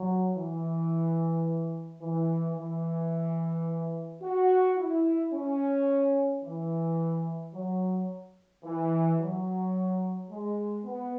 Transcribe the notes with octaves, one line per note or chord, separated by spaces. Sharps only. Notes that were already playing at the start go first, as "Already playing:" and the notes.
Already playing: F#3
E3
E3
E3
F#4
E4
C#4
E3
F#3
E3
F#3
G#3
B3